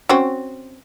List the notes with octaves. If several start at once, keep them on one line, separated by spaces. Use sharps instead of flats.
C4 C#4 F#4